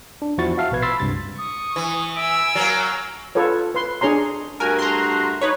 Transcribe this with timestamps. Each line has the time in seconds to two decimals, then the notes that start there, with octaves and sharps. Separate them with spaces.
0.22 D4
0.38 E2 F3 E4 F#4 C#6 A6
0.57 F#4 E5 F5 A5
0.71 A#1 B2 B4 G#6
0.82 B5 C6 E6 A6 B6 C7
1.00 C#2 G2 C3 A6
1.38 C#6 D#6
1.76 E3
2.16 E5 G#5 E6 D7
2.55 F#3 A#3 A#4
3.35 F4 A4 B4 C#5
3.75 B4 C6
4.01 D4 G#4 C#5 A#5 C6
4.60 G2 A3 F#4 A#4 G#5
4.79 A#5 C6
5.41 D#4 B4 C#5